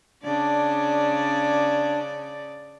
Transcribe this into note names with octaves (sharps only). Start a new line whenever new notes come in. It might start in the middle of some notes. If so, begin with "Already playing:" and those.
C#3 D4 D5